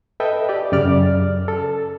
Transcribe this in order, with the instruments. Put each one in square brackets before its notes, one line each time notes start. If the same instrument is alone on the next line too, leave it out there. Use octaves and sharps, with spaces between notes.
[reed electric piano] A4 B4 D#5 E5 G5
G4 D5
F#2 C#3 D5 F6
A4